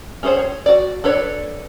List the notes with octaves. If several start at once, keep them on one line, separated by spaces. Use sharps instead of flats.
C#4 G#4 A4 C5 C#5
C#5
F#4 D5
D4 A4 B4 C#5 D5